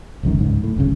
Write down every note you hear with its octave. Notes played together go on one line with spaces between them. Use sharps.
F1 C#2 F#2 D#3
C#2 G#2
A2
F1 C#2 F#2 C#3